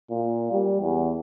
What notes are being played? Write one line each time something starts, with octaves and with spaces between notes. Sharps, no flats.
A#2
G3
E2